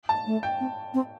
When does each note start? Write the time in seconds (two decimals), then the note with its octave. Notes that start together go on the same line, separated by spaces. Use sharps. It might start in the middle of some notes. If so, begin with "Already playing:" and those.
0.09 A5
0.26 A3
0.43 G5
0.60 C4
0.94 C4